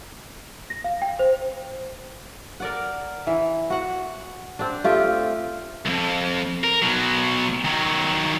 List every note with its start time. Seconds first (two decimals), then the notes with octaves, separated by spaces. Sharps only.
0.70 A#6
0.84 F5
1.02 G5
1.19 C5
2.60 A#4 D5 F#5
3.27 E3
3.70 F#4 F#5
4.59 C4 D4
4.84 A3 F4 G4
5.86 C2 F2
6.64 A#4
6.82 B2 F#3
7.65 D#3 F#3